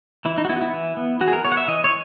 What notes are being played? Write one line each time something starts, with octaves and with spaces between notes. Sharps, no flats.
E3 E4
D#4
F#4
B3 E4
F#4
E4
E3
B3
E3 F#4
G#4
A#4
B3 C#5
F#5
E5
E3 D#5
C#5